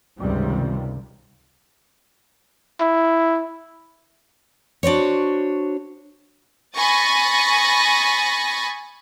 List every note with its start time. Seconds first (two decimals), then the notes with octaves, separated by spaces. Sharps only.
0.20 C#2 G2 C3 D#3 G3
2.80 E4
4.83 D4 F#4 C5 C#5
6.76 G#5 B5 C#6 D#6 A6 A#6